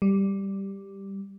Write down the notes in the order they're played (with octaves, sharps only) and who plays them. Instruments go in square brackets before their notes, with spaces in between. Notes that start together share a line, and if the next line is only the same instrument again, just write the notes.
[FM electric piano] G3